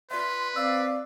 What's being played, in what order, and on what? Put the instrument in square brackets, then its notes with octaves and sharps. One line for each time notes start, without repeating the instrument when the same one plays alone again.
[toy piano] F4 D5 E5 [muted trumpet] B4 [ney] C6
[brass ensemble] C4 D5 [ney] F5 [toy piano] E6